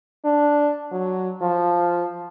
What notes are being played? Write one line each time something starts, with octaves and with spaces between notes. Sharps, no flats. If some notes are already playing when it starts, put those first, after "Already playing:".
D4
F#3
F3